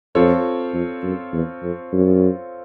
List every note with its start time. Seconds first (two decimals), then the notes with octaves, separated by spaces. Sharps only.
0.15 F2 C4 F4 A4 C#5
0.73 F2
1.03 F#2
1.33 E2
1.62 F2
1.92 F#2